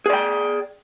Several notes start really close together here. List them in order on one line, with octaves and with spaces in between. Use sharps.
G#4 D5 G5